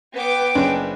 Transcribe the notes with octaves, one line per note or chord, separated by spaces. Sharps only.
B3 G5 D6
F#1 C#4 D4